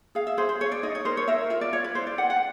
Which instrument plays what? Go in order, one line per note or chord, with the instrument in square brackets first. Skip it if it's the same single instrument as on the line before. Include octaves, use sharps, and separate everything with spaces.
[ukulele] G#4 F5
E5
G#4 C5
C5
G#4 C#5
D5
D#4 D#5
C#5
A#4 C5
C#5
A#4 E5
F4 E5
D5
F4 C#5
B4
E4 C5
D5
B4 F#5
F#5